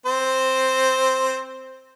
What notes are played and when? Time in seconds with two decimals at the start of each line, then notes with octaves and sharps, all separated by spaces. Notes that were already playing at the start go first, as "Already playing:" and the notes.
0.06 C4 C5